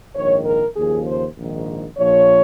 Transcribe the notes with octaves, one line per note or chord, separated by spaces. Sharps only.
A#1 G#2 D#3 C#5
A#4
D#2 C#3 F3 G#4
C5
A#1 G#2 D#3
A#1 A#2 F3 C#5